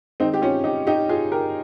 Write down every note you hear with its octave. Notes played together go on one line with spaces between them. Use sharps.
D#3 G#3 C4 D#4
G4
C#4 F4
D#4 G4
D#4 G4
F4 G#4
G4 A#4